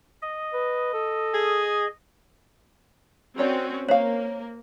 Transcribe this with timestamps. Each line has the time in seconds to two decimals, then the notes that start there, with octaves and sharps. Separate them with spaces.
0.22 D#5
0.53 B4
0.94 A4
1.34 G#4
3.38 C4 C#4 F#4 A#4 C#5 D5
3.89 A#3 C5 C#5 F5